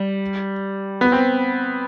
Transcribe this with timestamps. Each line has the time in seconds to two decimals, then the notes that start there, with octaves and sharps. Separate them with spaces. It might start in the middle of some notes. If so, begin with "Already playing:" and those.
Already playing: G3
1.01 B3
1.12 C4